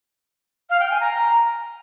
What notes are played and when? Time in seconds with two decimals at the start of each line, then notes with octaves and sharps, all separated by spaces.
0.69 F5
0.79 G5
0.90 G#5
1.00 A#5